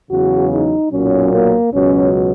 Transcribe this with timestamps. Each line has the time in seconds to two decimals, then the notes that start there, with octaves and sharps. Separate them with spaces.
0.10 E2 C#3 F#3 F#4
0.51 D#4
0.91 B1 A#2 F#3 C#4
1.32 A#3
1.72 C#2 B2 F#3 C#4